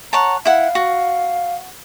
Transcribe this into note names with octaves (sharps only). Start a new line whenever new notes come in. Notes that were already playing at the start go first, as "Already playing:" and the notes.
C#5 F#5 A5 A#5
E4 F5 F#5
F#4